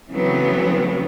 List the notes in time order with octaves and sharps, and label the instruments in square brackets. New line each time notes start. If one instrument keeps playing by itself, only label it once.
[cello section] C#3 E3 F#3 A3 B3 C4